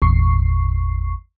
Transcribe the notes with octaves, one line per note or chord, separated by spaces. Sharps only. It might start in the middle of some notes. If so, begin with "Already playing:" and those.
G#1 E2 A#2 C#6 C7